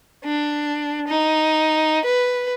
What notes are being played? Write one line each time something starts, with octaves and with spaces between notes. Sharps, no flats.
D4
D#4
B4